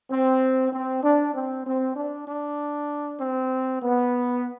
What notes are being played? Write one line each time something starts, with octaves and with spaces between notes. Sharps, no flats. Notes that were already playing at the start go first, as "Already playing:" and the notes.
C4
C4
D4
C4
C4
D4
D4
C4
B3